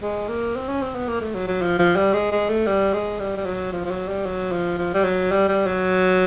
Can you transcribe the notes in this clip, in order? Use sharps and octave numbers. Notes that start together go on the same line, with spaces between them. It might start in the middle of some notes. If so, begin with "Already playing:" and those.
G#3
A#3
C4
C#4
C4
B3
A#3
A3
F#3
F#3
F3
F3
G3
G#3
G#3
A3
G3
G#3
G3
G3
F#3
F3
F3
F#3
G3
F#3
F3
F3
G3
F#3
G3
G3
F#3